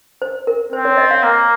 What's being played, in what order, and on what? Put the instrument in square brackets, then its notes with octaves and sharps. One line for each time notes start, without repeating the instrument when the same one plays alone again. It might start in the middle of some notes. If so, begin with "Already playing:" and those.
[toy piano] C5
A#4
[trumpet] C4 [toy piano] C5
[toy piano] C#5
D#5
F5
[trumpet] A#3